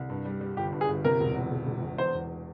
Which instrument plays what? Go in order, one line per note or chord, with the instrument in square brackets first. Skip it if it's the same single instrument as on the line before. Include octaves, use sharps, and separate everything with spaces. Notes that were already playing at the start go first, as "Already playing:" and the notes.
Already playing: [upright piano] C2
G2
G3
G3
[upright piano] G1 [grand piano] G4
[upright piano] G2
[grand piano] G#4
[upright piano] G1
[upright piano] C3 [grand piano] A#4
[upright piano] E1
E2
E1
E1
E1
[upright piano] E2 [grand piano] C5
[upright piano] E2